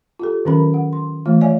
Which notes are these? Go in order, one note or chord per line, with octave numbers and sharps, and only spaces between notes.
F4 G4 A4
D#3 F#3 C#4 A#4 B5
F#5
C6
E3 G#3 A3 F4
C#5 D5 E5 F5 G#5